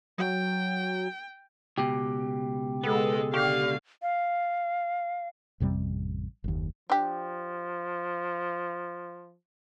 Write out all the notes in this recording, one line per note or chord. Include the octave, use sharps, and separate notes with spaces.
F#3 G5
C#2 B2 G4
G#3 B3 A4
D3 G4 F5 C#6
F5
A1 F2 C3 G3
F#1 D#2
F3 D4 G4